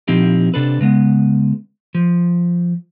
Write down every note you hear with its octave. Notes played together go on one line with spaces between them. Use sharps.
A#2 F3 C4 D#4 E4 G4
C3 D4 A4 B4
C#3 G#3 B3
F3